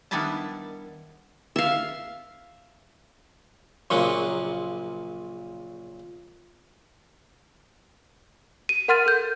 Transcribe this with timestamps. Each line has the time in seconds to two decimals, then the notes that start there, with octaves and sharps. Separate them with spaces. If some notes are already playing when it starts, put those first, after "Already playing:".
0.11 D#3 G3 B3 D4 E4 A5
1.56 E5 F5
3.90 A#1 A#2 C#3 F#3 A#3
8.69 D#7
8.88 A#4 F#5 C6 F6 A6 D#7
9.06 A4 G6